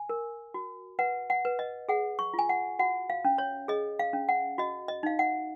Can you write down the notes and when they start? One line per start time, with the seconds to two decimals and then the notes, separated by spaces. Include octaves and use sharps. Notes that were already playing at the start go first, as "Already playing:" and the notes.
Already playing: G#5
0.09 A#4
0.54 F#4
0.99 B4 F#5
1.30 F#5
1.45 B4
1.59 D#5
1.89 G#4 F#5
2.19 C#6
2.34 F4
2.39 G#5
2.49 F#5
2.79 F#4 F#5
3.10 F5
3.25 C#4
3.38 C#5
3.68 G#4 D#5
3.99 F5
4.13 C#4
4.29 F#5
4.58 F#4 D#5
4.88 D#5
5.03 D#4 F5
5.19 F#5